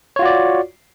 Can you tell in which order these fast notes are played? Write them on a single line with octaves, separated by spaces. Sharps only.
C#5 F4 F#4 D5